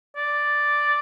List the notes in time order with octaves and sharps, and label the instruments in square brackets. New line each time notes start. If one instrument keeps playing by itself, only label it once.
[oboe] D5